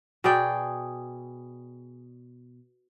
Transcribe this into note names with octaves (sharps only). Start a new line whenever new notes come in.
B2 G#4 D5 G5